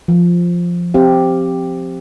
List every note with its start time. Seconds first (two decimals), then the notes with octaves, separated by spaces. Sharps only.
0.08 F3
0.94 C4 G4 F5